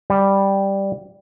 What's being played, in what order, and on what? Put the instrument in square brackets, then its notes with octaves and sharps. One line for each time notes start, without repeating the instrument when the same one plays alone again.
[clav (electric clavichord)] G3